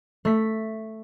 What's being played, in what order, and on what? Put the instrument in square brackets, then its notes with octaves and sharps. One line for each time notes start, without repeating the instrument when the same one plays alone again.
[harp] A3 B6